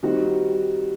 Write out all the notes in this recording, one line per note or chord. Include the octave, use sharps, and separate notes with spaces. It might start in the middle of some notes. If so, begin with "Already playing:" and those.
D#3 G3 C4 D#4 F#4